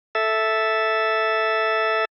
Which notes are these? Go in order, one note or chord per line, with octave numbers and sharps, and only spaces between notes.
A4 E5